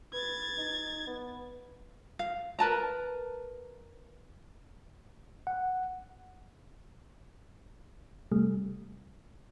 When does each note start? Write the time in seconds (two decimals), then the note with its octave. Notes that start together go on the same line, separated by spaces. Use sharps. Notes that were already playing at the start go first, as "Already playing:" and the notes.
0.14 B4 G#6 A6
0.58 D#4
1.07 B3
2.19 F5
2.59 A#4 B4 A5 A#5
5.47 F#5
8.31 C3 G3 A3